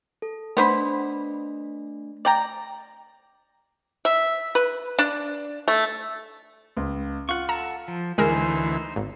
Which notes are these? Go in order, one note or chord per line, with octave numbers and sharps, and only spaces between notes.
A4
A3 B3 D4 C5 B5
D5 G5 A#5
E5
B4
D4
A3
C#2
F4 F#5 C#6
A4 F#5 A5 A#5
F3
D2 E3 G#3 D#4 A#4 C5 G#5
G#1